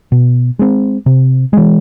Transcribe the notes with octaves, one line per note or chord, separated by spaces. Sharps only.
B2
G#3 C4
C3
E3 G#3